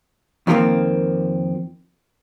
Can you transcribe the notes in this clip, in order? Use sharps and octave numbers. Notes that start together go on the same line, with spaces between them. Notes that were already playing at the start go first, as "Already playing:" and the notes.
F2 D#3 F3 G3 A#3 C4